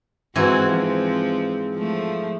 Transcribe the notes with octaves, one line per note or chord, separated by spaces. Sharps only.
G#2 E3 C4 F#4 G#5
F3 C4
F3 A3